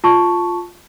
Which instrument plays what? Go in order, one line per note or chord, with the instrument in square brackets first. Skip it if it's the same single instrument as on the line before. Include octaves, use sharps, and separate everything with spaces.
[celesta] F4 A5 C#6